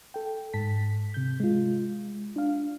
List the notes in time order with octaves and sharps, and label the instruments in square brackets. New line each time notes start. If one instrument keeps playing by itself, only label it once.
[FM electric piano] A4 G5
G#2 A5 B6
C3 G6
G#3 F4
D4 F5